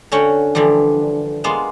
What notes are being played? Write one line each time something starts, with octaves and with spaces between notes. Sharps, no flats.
D3 C#4 F#4 F#5 G5
D3 E3 F3 G3
G#3 A#3 B3 F4